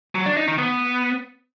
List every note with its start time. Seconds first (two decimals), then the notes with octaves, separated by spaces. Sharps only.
0.15 F#3
0.26 D4
0.37 D#4
0.48 D#3
0.58 B3